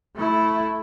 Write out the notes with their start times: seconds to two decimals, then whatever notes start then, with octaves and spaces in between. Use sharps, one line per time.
0.16 A3 E4